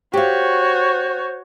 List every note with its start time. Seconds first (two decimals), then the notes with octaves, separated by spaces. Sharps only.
0.13 F#4 G4 C5 C#5 F5